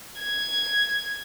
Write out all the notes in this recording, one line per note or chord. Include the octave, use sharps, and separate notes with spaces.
G#6